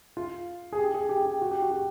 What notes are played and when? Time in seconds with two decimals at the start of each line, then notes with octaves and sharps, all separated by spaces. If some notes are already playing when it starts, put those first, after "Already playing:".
0.17 F4
0.72 G#4
0.78 G4
0.94 G#4
1.09 G4
1.26 G4
1.42 F#4
1.51 G4
1.62 F#4
1.71 G4